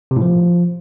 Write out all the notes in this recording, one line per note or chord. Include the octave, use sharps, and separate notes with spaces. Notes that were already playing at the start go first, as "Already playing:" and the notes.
C3
A2
F3